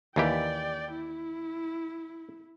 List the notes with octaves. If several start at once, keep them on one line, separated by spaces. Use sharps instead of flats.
D#2 E3 G4 D5 G5
E4